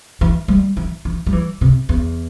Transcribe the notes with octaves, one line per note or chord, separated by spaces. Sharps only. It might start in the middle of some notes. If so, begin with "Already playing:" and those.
E3
G3
E3
E3
G3
E3
C3
E2